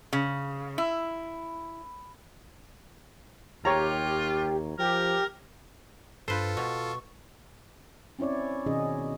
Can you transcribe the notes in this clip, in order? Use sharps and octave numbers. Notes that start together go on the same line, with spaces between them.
C#3
E4
D#2 F4 G4 C#5 A#5
F3 G4 A#4
G2 F4 A4 B4 C5
B2 C#6
C4 C#4 E4 C#5 D5
B2 D#3 C#4 D#4 G#4 D#5